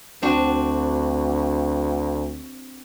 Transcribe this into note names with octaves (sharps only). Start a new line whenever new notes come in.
D2 C4 D4 F#4